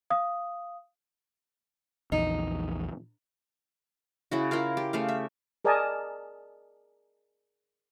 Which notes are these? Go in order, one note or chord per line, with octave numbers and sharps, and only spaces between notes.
F5 D#6
A#1 E2 D#4
C#3 E4 F#4
E4 F4 A#4 F5
G4
C#3 A3 F5
E5
G#4 A#4 D5 D#5 G#5 A5